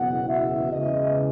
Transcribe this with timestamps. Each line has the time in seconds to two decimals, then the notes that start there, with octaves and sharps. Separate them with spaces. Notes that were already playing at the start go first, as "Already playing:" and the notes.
Already playing: F#1 E2 B2 F#5
0.27 E5
0.71 E2 C#3 E3 G#3 D#5